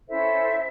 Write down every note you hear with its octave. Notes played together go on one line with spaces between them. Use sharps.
C#4 E4 A4 C5 E5